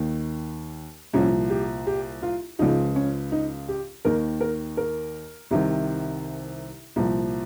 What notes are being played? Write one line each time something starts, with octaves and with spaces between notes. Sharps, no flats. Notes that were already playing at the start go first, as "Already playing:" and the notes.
Already playing: D#2 D#3
C2 A#2 F3 C#4
G4
G4
F4
C#2 C#3 F3 D#4
C#4
D#4
G4
D#2 D#3 A#4
A#4
A#4
C2 C3 D#3
C2 A#2 F3